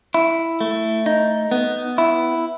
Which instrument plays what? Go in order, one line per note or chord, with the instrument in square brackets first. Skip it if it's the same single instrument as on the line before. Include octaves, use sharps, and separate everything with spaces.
[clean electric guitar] E4
A3
D#4
B3
E4